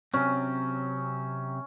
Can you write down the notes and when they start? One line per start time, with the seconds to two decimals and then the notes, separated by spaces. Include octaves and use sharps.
0.14 C3 F#3 C4 C#4